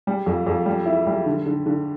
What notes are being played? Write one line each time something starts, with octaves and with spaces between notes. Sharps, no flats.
G3
F2
F2
G3
E4
G3
D3
D3
D3